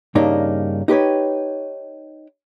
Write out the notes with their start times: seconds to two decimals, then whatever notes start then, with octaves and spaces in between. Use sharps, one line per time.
0.15 G2 C#3 A#3 D4 D#4
0.88 D#4 G4 B4 C#5